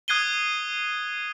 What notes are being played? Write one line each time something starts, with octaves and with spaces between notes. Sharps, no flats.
D#6 F#6 G#6 C7 D#7 G7